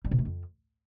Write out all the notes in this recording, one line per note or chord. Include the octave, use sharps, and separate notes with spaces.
G3
B2
A3
F2